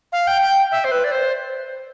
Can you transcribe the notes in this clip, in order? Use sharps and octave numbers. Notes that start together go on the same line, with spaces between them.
F5
G5
G5
E5
C5
B4
D5
C5